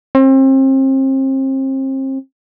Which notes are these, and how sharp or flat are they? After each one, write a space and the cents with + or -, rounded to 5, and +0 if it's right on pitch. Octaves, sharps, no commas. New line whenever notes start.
C4 +35